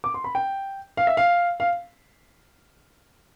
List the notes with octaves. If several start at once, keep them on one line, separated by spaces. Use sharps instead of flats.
D6
C6
B5
G5
F5
E5
F5
F5